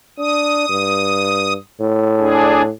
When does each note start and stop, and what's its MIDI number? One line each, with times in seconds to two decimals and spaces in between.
0.19 0.67 62
0.19 1.53 87
0.69 1.56 43
1.80 2.71 45
2.18 2.62 62
2.18 2.62 68